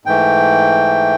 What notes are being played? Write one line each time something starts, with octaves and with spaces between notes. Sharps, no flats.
G#2 E3 A3 G5